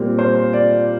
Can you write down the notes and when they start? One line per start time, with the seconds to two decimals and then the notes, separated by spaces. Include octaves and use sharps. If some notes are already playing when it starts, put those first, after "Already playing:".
Already playing: A#2 G3 C4 A#4
0.18 C5
0.53 D5